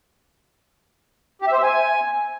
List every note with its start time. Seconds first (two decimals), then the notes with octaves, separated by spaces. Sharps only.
1.42 G4
1.47 E5
1.53 C5
1.58 E5
1.63 G#5